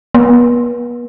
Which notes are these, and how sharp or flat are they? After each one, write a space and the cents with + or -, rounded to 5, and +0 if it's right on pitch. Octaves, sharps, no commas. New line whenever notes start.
B3 -40